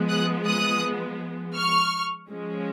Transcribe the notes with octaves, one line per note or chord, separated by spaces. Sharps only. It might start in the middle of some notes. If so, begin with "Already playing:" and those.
Already playing: F3 G#3 B3
D#6 F#6
D#6 F#6
C#6 F6
F3 G#3 C#4